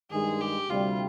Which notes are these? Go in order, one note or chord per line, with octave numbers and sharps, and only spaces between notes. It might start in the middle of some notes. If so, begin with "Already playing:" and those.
G2 D#3 G#3 G#4
G4
D2 C3 G3 F4